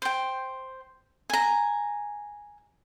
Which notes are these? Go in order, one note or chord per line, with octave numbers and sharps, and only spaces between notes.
C5 G5
G#5 A#5